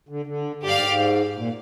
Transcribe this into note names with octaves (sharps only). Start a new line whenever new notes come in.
D3
D3
G2 G4 D5 F5
G#2
G#2
A#2